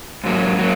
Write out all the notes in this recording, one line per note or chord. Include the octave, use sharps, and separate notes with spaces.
G#2 F#3 A#3
F#3 A#3